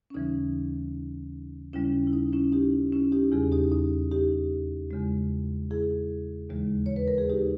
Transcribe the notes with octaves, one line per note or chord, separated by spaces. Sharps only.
C#4
D#2 C#3 E3 G3 D#4
D#2 C#3 G3 C#4 E4
E4
D#4
C#4 E4
D#4 G4
C#4 E4
D#4 G4
E2 C#3 G3 E4 G#4
D#4 G4
D#4
D#4 G4
E2 C#3 G#3
E4 G#4
D#2 C#3 E3 G#3
C#5
B4
A#4
G#4
D#4 G4